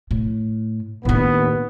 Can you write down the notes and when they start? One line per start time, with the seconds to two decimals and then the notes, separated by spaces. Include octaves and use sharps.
0.11 A2
1.05 D#2 A2 B3 D4